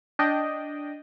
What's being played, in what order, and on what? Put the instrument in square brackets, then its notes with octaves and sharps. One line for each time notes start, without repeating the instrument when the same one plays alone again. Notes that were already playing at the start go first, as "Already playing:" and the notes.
[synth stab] D4 D#5 G5